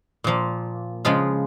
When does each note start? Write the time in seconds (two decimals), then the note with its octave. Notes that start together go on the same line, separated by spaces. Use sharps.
0.24 A#2 F3 A#3
1.05 C#3 F3 G#3 F4